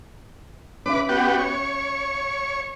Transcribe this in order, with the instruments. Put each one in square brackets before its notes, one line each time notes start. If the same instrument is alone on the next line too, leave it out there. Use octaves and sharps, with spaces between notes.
[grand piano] C#4 E5 [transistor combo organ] B4 D6
[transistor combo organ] B3 F#4 G4
C#5